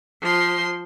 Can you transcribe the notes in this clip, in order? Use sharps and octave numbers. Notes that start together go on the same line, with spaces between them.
F3 C6